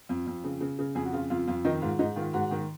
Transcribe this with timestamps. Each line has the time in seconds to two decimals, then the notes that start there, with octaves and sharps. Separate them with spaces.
0.09 F2
0.27 F2
0.44 C#3
0.61 C#3
0.79 C#3
0.95 F2 G#4
1.05 F#4
1.13 C#3 F4
1.30 F2 F4
1.47 F2 F4
1.64 D#3 D#4
1.82 G#2 F4
1.99 G#2 D#4
2.16 D#3 F4
2.33 G#2 F#4
2.51 D#3